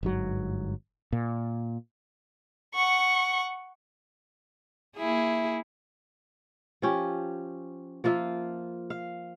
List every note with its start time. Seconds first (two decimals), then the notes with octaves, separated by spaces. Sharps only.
0.03 G1 G#2 F#3
1.12 A#2
2.74 F#5 C#6
4.97 A#3 E4 G#4
6.82 F3 C#4 G4
8.04 F3 A#3 F4 E5
8.90 F5